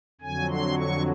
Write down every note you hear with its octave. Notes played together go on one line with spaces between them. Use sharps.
F2 D3 F#3 G#5
C6
C#6